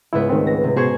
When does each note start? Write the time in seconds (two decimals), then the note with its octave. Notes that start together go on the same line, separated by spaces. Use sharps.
0.13 C#2 G#2 B3 E4
0.29 D#3 A3 C4
0.47 A#6
0.64 C3
0.76 B2 G#4 C5 C#6 G#6